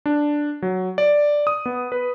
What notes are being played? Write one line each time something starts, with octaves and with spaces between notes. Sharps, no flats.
D4
F#3
D5
D#6
B3
B4